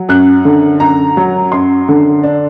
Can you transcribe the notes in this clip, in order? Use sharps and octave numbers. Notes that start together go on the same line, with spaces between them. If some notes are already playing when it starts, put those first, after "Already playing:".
Already playing: F#3
F#2 F#6
D3
F#2 A#5
F#3
F#2 C6
D3
D4